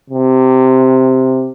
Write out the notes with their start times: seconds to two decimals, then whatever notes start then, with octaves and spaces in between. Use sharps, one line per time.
0.10 C3